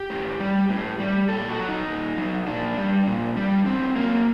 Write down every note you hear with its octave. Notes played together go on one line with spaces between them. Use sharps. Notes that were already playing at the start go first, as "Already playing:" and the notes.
Already playing: G4
A2
G3
A2
G3
A#2 A4
F#4
F#3
D#4
A#2
F#3
A#2 D4
G3
A#2
G3
A2 C4
F#3 A#3